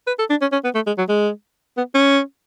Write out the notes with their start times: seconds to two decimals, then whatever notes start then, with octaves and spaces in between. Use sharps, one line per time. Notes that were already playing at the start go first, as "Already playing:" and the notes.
0.07 B4
0.19 A4
0.30 D4
0.41 C#4
0.52 C#4
0.64 B3
0.75 A3
0.87 G#3
0.98 F#3
1.09 G#3
1.77 B3
1.94 C#4